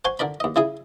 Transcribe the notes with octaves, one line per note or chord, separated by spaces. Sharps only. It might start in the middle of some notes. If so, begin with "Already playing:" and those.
C5 F#5 G#5 C6 C#6
D3 A#4 D5 B5
D#2 D#5
C#3 E4 G#4 D#6